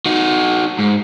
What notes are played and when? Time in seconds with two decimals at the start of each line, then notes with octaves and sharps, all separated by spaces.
0.06 D#4 F#4
0.79 G#2